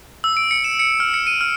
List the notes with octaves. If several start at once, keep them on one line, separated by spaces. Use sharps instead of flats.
E6
D7
C#7
E7
C#7
F6
C#7
D#7
F6